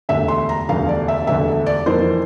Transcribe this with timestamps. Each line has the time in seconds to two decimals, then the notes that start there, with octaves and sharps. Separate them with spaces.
0.09 E1 D2 D3 E5
0.28 C6
0.49 A#5
0.69 E1 D2 D3 F5
0.89 D5
1.08 E5
1.27 E1 D2 D3 E5
1.66 D5
1.86 F2 E3 A#3 C5